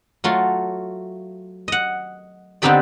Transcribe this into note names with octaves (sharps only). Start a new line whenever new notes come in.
F#3 A3 F4
D#5 F#5
D3 B3 C4 D#4 G4 D5